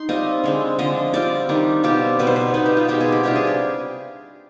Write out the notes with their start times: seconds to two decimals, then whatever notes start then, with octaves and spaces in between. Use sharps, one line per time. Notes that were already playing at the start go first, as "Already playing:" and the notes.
Already playing: D#4 C6
0.09 G3 C4 F4 D#5
0.44 D3 G#3 C4
0.79 D3 F3 G#3 D#5
1.13 G3 C4 F4 D5
1.49 D#3 G3 D4
1.83 B2 G3 C4 F4 G4
2.19 B2 G3 C4 D#4 B4
2.27 C5
2.36 B4
2.54 B2 B3 D#4 B4
2.66 G4
2.77 F4
2.88 B2 G#3 C4 F4 G4
3.01 G#4
3.12 G4
3.23 C3 G3 D4 F4 G4
3.35 G#4
3.47 G4